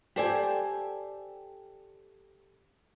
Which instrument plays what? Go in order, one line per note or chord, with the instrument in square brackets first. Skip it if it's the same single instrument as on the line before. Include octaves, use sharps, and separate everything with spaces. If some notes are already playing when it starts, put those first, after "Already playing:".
[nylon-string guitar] G4 A4 C5 D5 G5 G#5